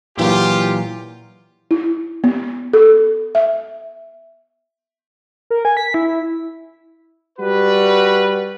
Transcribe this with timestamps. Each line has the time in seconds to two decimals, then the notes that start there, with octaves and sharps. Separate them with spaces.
0.17 A#2 E3 F#3 F4 G4
1.71 E4
2.24 B3
2.74 A4
3.35 E5
5.50 A#4
5.65 G#5
5.77 B6
5.94 E4
7.39 G3 F#4 B4